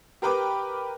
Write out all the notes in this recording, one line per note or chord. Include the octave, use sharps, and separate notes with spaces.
G4 A#4 B4 G5 D6